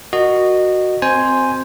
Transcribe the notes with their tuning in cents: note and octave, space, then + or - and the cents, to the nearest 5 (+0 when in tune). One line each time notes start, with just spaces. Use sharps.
F#4 +0 A#4 +0 D#5 -20
C4 +0 C5 +0 G#5 +0